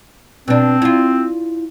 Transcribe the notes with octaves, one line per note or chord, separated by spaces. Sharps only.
B2 C4 D4
E4 F4